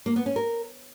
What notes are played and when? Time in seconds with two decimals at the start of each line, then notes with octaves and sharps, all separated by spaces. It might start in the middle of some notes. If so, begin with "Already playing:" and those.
0.06 A#3
0.16 B3
0.26 C#4
0.36 A#4